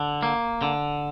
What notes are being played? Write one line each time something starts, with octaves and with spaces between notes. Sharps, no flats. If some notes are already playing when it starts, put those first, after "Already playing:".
Already playing: D3
A#3
D3